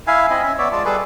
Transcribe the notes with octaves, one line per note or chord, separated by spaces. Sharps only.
E4 E5 F5 G#5
C4 E4 D#5 G#5
C#4 E5
B3 C#5 D5 E5
G#3 F4 D5 A5
G3 G#4 A4 B4